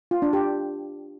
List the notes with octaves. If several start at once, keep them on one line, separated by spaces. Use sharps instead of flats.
F4
D4
G4